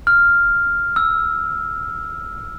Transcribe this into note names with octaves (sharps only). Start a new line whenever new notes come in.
F6
E6